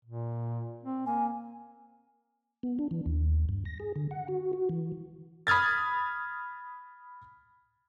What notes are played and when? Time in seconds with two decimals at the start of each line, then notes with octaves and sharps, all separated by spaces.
0.05 A#2
0.83 C4
1.06 A#3 G#5
2.63 B3
2.79 D4
2.91 E3
3.06 D#2
3.49 G2
3.65 A#6
3.80 G#4
3.96 D3
4.11 F#5
4.28 F#4
4.53 F#4
4.69 E3
5.47 B5 D#6 F6 G#6 A6